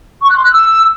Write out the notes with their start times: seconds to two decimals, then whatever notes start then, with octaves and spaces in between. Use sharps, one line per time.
0.22 C#6
0.29 F#6
0.36 C6
0.43 F#6
0.50 E6